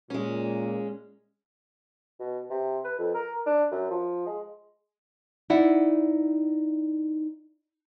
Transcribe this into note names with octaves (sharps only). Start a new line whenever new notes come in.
A#2 G#3 C#4
B2
C3
B4
F2
A#4
D4
F#2
F3
G#3
D#4 E4 D5 F#5